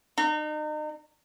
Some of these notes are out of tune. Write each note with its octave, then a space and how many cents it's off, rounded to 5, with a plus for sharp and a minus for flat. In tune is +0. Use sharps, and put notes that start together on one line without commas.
D#4 -35